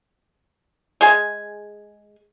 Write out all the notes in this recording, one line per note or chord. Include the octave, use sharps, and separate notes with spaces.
G#3 G#4 G#5